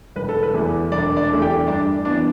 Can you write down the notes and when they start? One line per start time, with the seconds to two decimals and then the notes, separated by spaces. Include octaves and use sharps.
0.16 E1 B4
0.29 A4
0.43 B4
0.54 E2 E3 A3
0.91 E1 D4 D5
1.17 D4 D5
1.30 E2 E3 A3
1.42 G4 G5
1.67 G2 D4 D5
2.05 E3 B3 D4 D5